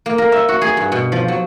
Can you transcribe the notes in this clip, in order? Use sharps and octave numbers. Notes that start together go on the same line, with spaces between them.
A#3
A#4
E5
F#4
G#4
G2
B2
F3
F#3